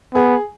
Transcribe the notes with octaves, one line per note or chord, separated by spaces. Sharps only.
B3 G#4